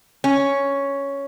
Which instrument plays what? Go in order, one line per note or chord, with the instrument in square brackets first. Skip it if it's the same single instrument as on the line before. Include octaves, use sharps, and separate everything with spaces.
[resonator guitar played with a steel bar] C#4